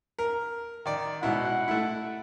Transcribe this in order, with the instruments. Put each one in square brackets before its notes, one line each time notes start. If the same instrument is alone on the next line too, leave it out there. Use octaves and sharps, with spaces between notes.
[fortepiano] A#4
D#3 D5
[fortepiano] G#2 B2 E4 [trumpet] F#5
[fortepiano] A3 E4